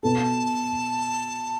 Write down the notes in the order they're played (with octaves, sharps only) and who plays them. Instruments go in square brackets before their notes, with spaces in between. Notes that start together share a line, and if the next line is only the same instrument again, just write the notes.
[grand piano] B2 B3 A4 [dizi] A5